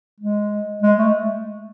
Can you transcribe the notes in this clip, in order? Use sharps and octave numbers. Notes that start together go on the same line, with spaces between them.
G#3
G#3
A3